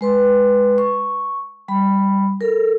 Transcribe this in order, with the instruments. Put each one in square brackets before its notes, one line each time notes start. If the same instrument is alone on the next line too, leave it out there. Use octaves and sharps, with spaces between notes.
[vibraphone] G#3 B4 C6
C#6
G3 B5
A4 A#4